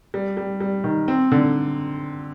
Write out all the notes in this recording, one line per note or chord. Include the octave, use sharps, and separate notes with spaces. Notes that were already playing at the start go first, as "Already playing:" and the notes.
G3
G3
G3
D#3
C4
D3